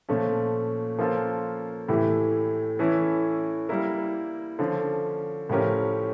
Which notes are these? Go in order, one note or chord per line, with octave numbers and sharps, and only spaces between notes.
A#2 F3 A3 C#4
F3 A#3 C#4 F4 A4
A2 E3 A3 E4 G4
E3 A3 C#4 E4
G3 A#3 E4 A#4
D3 F3 C#4
A2 F3 C#4 G4 A#4